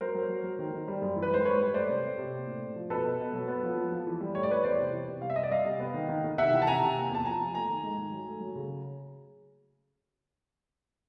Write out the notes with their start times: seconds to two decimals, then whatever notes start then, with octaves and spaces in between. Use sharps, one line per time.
0.01 F#3 A#4 C5
0.15 F#3
0.29 F#3
0.43 F#3
0.59 D#3
0.73 D#3
0.88 G3
1.02 F#2
1.16 E3
1.22 B4
1.30 G#2 C5
1.45 G#2 B4 C#5
1.61 G3
1.74 A3 C5 D5
1.89 C3
2.04 C3
2.18 C3
2.33 A#3
2.46 A2
2.61 A2
2.76 F3
2.90 B2 A4 B4
3.05 B2
3.20 B2
3.33 F#3
3.48 B3
3.63 F3
3.78 F3
3.92 F3
4.07 E3
4.21 G3
4.35 A2 C#5
4.43 D5
4.50 G3 B4 C#5
4.64 E2 C5 D5
4.79 C3
4.93 E3
5.08 C3
5.22 G3 F5
5.30 E5
5.36 C3 D#5
5.43 D5 E5
5.51 G3 D#5 F5
5.65 C3
5.80 B3
5.94 D#3
6.09 D#3
6.24 D#3
6.38 C3 E5 F#5
6.53 E3
6.62 A5
6.67 C3 G#5 A#5
6.82 C3
6.96 A#3
7.11 E2 A5
7.25 F3 G#5 A#5
7.40 F3
7.54 A3 G#5 A#5
7.69 D#3
7.84 G#2
7.98 D#3
8.12 F#3
8.27 A3
8.41 F#3
8.56 C#3